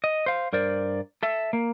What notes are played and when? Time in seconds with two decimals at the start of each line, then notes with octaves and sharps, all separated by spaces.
0.04 D#5
0.26 C5 F5
0.53 G2 A#4 C5 D5
1.23 A4 E5
1.53 A#3